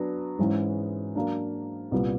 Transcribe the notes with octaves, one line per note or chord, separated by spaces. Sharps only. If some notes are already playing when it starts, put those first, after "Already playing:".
Already playing: F#3 B3 D4
G#2 E3 G#3 C#4
F#3 A#3 D4
C2 A#2 G3 B3